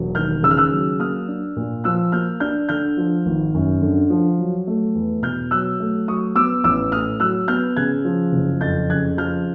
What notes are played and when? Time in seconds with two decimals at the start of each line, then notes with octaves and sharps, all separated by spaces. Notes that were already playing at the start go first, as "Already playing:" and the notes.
Already playing: E1 F#3
0.15 D#2 F6 G6
0.43 C#3 E6
0.51 F6
0.57 E6 F#6
0.71 F#3
0.99 A#3 D#6 F6
1.28 D4
1.56 A#2
1.84 F3 E6 F#6
2.12 A#3 F6 G6
2.40 D4 F6 G6
2.69 D3 F6 G6
2.97 F3
3.26 G#1
3.54 F#2
3.82 D3
4.10 F3
4.38 F#3
4.67 A3
4.95 E2
5.22 B2 F6 G6
5.51 F#3 E6 F#6
5.80 A3
6.08 F#3 C#6 D#6
6.35 B3 D6 E6
6.64 A1 D6 E6
6.92 A2 D#6 F6
7.20 F#3 E6 F#6
7.48 B3 F6 G6
7.76 C#3 F#6 G#6
8.04 F3
8.33 F#1
8.61 F2 G6 A6
8.90 C#3 F#6 G#6
9.17 F3 F6 G6